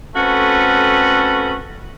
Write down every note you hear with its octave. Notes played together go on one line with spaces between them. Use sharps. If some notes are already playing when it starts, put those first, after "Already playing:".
A3 C4 C#4 F#4 A4 B4